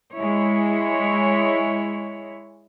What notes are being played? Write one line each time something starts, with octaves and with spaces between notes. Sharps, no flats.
G#3 E4 C#5